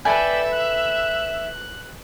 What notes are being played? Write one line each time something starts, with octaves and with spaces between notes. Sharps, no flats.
A4 B4 D5 E5 G5 G#5 B5
F#6